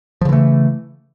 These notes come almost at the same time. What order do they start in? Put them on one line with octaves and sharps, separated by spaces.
F3 C#3 E3 A3